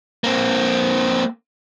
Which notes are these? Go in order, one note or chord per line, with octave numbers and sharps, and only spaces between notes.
A#3 C4